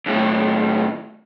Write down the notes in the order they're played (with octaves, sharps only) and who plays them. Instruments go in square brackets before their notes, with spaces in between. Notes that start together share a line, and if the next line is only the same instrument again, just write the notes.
[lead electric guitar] D#2 A2